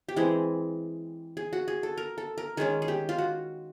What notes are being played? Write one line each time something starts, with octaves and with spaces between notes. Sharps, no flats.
G4
E3 G#3 C4 G#4
G#4
F#4
G#4
A4
A#4
A4
A#4
D#3 G#3 C#4 G#4
G#4
G4
F4
F#4